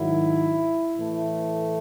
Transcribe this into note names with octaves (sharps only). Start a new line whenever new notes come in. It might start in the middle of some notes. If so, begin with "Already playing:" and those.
Already playing: G#2 D#3 F#3 E4
A2 E3 A3